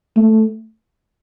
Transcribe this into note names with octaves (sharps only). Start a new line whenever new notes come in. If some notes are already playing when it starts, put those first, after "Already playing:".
A3